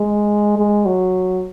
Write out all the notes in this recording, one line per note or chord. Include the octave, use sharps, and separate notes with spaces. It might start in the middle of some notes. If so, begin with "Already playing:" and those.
Already playing: G#3
G#3
F#3